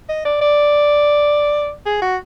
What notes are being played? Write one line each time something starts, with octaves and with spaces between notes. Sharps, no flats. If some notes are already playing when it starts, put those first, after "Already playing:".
D#5
D5
D5
G#4
F#4